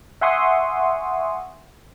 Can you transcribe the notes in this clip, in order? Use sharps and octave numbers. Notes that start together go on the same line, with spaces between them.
E5 F#5 G#5 C6 C#6 D#6